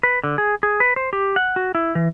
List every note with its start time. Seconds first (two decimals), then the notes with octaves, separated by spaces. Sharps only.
0.03 B4
0.24 D3
0.38 G#4
0.63 G#4
0.80 B4
0.96 C5
1.13 G4
1.36 F#5
1.56 F#4
1.75 E4
1.95 E3